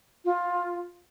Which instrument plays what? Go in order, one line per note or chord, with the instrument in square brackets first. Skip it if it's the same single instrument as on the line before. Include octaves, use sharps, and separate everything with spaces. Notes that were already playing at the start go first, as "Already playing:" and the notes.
[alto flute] F4